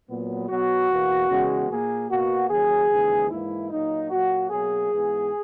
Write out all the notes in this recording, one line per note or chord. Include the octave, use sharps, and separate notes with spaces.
A#2 F#3 B3
B2 F#3 B3 F#4
E2 B2 A#3
E2 C#3 G#3 B3
A#2 A#3 G#4
B2 A#3 F#4
D#2 C#3 F#3 G#4
D#2 C#3 E3 G#3
G#2 E3 A#3 E4
A#2 F#3 A#3 D#4
A#2 F#3 A#3 F#4
B2 F#3 A#3 G#4
G#2 E3 B3